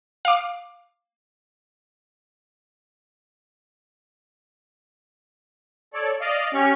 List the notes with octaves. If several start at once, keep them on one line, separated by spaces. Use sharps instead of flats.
F5 D6
A4 C#5 D5
D5 D#5 F5
C#4 G4 C#6 F6